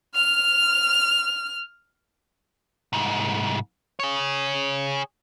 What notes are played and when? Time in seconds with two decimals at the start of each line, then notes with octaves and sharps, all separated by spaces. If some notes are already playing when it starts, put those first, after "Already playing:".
0.15 F6 F7
2.93 C2 G#2
4.00 G#4 C#5